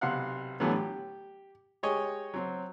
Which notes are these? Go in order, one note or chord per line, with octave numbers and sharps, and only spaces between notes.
B1 C3 F5 F#5 F#6
A2 D3 E3 F#3 G3 B3
G4
G#3 G4 C#5 D#5 G#5
F#3 C4